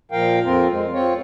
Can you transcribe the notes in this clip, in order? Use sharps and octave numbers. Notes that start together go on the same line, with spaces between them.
A#2 F3 A#4 F5 G5
F2 C4 F4 A#4
G#3
C4 F4 C#5